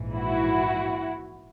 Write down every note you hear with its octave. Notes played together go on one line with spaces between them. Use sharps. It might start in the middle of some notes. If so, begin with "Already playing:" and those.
Already playing: A#1 G#2 E3
E4 F#4